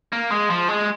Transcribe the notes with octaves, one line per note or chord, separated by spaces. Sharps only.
A#3
G#3
F3
G#3